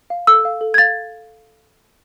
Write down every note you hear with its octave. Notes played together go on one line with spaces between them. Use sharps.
F5
A4 E6
F5
A4
G#6
F5 A6